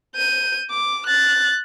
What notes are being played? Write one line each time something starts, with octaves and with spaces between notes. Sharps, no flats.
G6 D#7
D6
F#6 A6